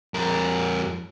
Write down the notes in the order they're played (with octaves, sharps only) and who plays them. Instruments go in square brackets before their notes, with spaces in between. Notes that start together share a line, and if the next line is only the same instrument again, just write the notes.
[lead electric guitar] F2 A#4